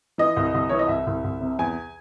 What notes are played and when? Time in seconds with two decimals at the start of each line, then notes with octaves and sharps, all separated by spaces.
0.18 E3 D#5
0.37 C2
0.54 C2
0.69 E3 C#5
0.79 D#5
0.88 C2 E5
1.07 C2
1.24 C2
1.41 C3
1.59 E2 G#5